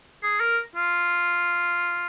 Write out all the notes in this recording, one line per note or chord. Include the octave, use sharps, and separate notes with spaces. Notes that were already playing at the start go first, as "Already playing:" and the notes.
G#4
A#4
F4